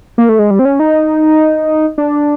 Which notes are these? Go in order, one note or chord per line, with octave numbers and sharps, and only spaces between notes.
A#3
A3
G#3
G3
C4
C#4
D#4
D4